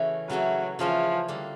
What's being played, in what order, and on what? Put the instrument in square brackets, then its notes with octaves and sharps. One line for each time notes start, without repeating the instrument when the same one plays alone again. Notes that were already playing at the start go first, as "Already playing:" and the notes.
Already playing: [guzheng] C#3 E3 A3 C#4 F#4
[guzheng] C#3 E3 A3 C#4 F#4 [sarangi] F#3
[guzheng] C#3 E3 A3 C#4 F#4 [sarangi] F3
[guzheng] D3 G3 A#3